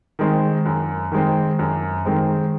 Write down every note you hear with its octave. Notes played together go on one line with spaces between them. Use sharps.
D#3 G#3 C4
F#2
D#3 G#3 C4
F#2
D#3 G#3 C4